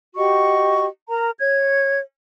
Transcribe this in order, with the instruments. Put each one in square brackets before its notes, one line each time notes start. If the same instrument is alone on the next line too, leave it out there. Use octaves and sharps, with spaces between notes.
[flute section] F#4 G4 D#5 C#6
A#4 A#5
C#5 G#6